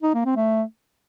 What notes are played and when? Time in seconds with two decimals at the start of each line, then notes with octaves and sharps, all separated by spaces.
0.03 D#4
0.14 A#3
0.25 C4
0.37 A3